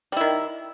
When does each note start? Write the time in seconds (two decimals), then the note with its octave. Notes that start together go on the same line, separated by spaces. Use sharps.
0.12 G3
0.17 E4
0.21 D#3